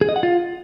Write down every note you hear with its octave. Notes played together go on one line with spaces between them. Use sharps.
G#4
D#5
F#5
F4